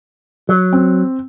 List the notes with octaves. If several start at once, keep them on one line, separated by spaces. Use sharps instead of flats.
F#3
C4